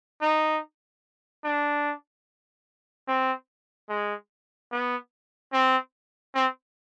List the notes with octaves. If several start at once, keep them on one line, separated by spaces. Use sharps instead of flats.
D#4
D4
C4
G#3
B3
C4
C4